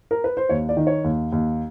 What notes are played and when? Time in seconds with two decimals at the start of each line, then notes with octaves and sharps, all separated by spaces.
0.11 A#4
0.24 B4
0.37 C5
0.49 D#2 C#5
0.69 D5
0.77 D#3
0.87 C#5
1.04 D#2
1.32 D#2